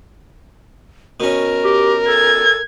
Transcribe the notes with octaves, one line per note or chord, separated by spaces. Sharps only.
B2 C#4 A#4
G4
A4 G#6